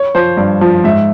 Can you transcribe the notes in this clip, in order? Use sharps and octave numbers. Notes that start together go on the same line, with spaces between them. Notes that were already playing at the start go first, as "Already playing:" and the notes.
Already playing: C#5
F3 C5
G2
F3
G#2 E5